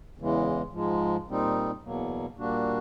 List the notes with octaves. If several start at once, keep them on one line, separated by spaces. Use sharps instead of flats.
E2 C#3 E3 G#3
G#2 F3 G#3
A#2 G3 C4 D#4
E2 B2 F#3 A#3
A#2 G3 A#3 D4 F#4